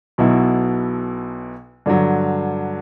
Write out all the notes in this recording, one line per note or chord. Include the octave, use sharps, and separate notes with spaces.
B1 B2 F#3 B3 E4
G2 D3 F#3